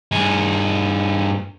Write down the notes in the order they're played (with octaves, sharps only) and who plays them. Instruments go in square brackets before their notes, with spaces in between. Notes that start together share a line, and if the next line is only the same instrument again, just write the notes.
[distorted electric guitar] G2 G#4